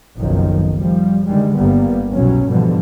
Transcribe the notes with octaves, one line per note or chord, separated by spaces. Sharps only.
F#1 B1 F#2 D#3 F3
F3 G3
D3 D#3 G3 G#3
G1 G3 A#3 B3
C2 B2 F#3 C#4
G#2 B2 D3 E3 F3 G3